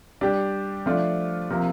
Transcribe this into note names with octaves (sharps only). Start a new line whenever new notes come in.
G3 D4 G4
F3 A3 D4 F4
C3 F3 A#3